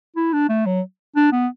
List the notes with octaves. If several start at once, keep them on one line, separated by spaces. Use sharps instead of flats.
E4
D4
A3
F#3
D4
B3